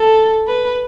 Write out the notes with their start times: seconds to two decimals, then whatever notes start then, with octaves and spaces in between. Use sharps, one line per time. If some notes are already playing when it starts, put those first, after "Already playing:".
Already playing: A4
0.48 B4